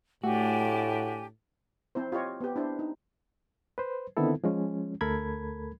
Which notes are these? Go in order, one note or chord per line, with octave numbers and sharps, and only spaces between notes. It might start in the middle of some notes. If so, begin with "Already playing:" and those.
A2 A3 D4 F#4 G4 G#5
C4 E4 C5
F4 G4 C#5 D#5
B3 G4
D4 E4 C5
D#4
B4 C5
D3 D#3 B3 C4 E4 A4
F3 G#3 C#4
D2 A3 A4 A#4 B5 G#6